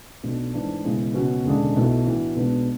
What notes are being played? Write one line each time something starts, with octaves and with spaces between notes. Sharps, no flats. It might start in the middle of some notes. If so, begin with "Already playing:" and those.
B1 B2 A3 D4
G#2 E3 A3 D4
E1 E2 C#3 G#3 C#4
C#2 B2 F#3 C#4 F#4
E1 D2 C#3 G#3 D4
B1 B2 A3 E4
A2 E3 B3 D4 F#4
B1 B2 G#3 B3 D4